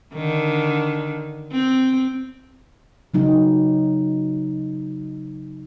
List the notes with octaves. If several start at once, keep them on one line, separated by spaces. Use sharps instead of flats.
D3 D#3
C4
C#3 F#3 D#4